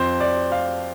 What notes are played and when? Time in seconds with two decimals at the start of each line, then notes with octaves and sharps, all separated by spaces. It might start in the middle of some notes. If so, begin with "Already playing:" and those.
Already playing: F2 F3 C5
0.20 D5
0.52 F5